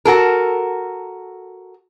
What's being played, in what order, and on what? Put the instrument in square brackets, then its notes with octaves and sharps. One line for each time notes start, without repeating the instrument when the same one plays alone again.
[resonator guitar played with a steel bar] F#4 A4 A#4